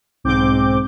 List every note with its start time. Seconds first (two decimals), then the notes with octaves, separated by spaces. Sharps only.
0.24 B1 G#2 C4 D6 G6